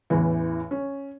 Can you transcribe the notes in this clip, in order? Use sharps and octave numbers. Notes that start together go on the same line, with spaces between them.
A1 E2 E3
C#4